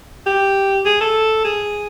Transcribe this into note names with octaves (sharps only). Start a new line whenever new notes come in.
G4
G#4
A4
G#4